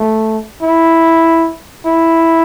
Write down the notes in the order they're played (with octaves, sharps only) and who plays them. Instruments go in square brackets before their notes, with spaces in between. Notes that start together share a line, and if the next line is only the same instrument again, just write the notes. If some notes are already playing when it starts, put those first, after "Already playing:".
Already playing: [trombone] A3
E4
E4